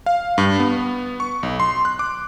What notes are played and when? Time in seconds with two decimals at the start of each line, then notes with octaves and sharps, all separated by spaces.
0.06 F5
0.38 G2
0.60 B3
1.20 C#6
1.43 B1
1.60 C6
1.85 F#6
1.99 D6